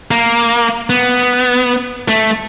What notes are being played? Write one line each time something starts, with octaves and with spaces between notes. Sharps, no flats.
A#3
B3
A3